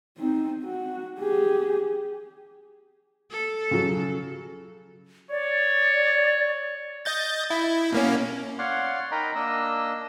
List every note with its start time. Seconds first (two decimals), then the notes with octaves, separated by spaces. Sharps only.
0.18 C4 D#4
0.64 F#4
1.20 G4 G#4
3.31 A4
3.71 C#3 F#3
5.31 C#5 D5
7.05 D#5 G6 A6
7.50 E4
7.92 B2 A#3 C#4
8.59 C#5 D5 F5 F#5 C6
9.11 D#4 A#4 D#5 G5 A#5 B5
9.35 A#3 D4 D#5 E6